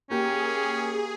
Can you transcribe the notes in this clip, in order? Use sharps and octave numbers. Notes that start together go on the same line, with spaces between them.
A#3 C#4 G4 G#4